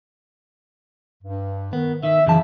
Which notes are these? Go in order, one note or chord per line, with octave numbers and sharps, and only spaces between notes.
G2
D#3 B3
D#3 E5
F#2 C#3 E3 A5